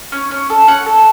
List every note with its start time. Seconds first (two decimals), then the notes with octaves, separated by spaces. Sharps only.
0.12 C#4
0.31 C#4
0.50 A4
0.67 C#4 F#5
0.86 A4